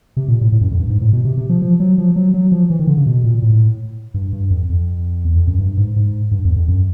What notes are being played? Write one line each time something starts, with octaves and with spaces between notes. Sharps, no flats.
C3
A#2
A2
A2
F#2
F2
G2
G#2
A2
B2
C3
C3
F3
F3
F#3
F3
F#3
F#3
F3
E3
D#3
D3
C#3
B2
A#2
A2
G2
G2
F2
F2
E2
F2
F#2
G2
G#2
G#2
G2
E2
F2
F#2